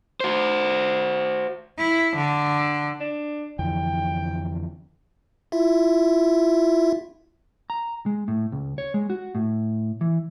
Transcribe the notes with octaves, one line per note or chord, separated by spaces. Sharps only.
F#4 C5
E4
D3
D4
F2 D3 E3 G5
E4 F4 E5
A#5
G#3
A2
C#2
C#5
G#3
F#4
A2
E3